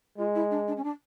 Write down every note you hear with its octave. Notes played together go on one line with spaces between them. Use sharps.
G#3 F4
E4
D4
D4
C#4
D4